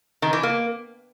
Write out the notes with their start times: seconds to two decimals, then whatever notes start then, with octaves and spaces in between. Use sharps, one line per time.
0.22 D#3
0.33 E3
0.43 A#3